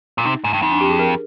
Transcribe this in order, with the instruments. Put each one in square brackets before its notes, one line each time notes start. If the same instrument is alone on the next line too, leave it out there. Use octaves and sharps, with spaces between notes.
[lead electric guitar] A#2
[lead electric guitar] C3 [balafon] D#4
[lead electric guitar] G#2
G2
[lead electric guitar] F2 [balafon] D#4
[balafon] D4
G4
G#4
A#4